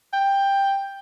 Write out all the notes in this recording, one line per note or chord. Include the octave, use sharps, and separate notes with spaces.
G5